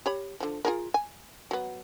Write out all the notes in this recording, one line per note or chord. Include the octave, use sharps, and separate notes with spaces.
G4 C#5 B5
D3 F3
F4 G#4 A#4
G#5
F#3 B3